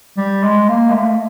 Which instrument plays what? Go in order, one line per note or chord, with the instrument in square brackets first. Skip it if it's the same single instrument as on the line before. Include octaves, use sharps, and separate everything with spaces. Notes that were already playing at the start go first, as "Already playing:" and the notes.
[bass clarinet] G3
G#3
A#3
G#3
A3